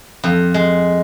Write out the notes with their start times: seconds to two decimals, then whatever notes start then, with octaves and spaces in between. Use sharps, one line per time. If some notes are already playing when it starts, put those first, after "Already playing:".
0.24 F2
0.54 G#3